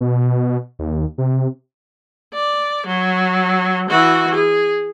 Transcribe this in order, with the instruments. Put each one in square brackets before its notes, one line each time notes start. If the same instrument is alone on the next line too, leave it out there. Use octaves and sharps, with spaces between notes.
[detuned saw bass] B2
D#2
C3
[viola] D5
F#3
E3 F#4
G#4